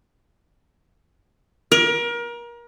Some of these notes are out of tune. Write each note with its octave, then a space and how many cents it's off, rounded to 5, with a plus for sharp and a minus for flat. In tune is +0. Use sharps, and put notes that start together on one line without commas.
A#4 +30